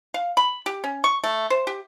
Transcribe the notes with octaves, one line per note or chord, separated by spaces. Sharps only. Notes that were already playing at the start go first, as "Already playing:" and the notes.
F5
B5
G4
C#4
C#6
A3
C5
G4